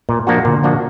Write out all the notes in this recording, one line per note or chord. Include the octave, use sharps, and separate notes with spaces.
A#2
F3 A#3 D4 F#4
A#2 D3
F3 A#3 D4 F#4